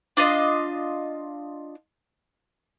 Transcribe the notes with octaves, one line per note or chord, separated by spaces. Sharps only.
D4 F4 D#5